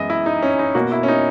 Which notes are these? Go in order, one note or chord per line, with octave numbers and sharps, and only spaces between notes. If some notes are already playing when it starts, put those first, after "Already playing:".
Already playing: F#2 E3 G#3 B3 D#5 E5
E4
D#4
C#4
D#4
B2 A#3 F#4
E4
C#4
D#4